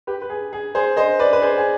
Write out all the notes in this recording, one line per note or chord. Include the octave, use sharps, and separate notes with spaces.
G4 B4
B4
G#4
G#4
G#4 C5
C5 D#5
B4 D5
B4
G#4 C5
G#4